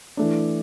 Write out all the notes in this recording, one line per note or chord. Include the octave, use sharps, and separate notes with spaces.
E3 A3 D4